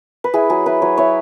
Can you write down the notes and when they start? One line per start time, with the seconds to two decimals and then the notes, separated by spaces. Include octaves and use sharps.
0.24 B4
0.34 E4 G#4
0.50 F#3 G#4
0.66 E4 B4
0.82 F#3 C#5
0.97 E4 C#5